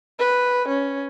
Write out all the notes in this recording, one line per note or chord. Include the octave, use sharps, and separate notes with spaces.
B4
C#4